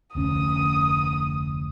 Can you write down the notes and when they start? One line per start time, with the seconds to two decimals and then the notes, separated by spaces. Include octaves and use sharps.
0.15 F1 D2 C#4 D#6